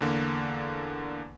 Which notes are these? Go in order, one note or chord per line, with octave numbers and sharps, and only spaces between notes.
E2 D3 A#3